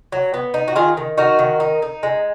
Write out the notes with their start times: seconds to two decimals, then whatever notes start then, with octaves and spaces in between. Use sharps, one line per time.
0.12 F#3
0.34 B3
0.54 D#4
0.68 F#4
0.76 D#3 F4 G#4
0.97 D#3
1.17 D#4 F#4 A#4
1.39 D#3
1.60 D#4
1.82 D#4
2.03 G#3